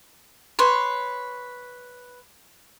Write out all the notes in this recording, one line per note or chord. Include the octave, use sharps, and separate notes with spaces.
B4 C#5 C6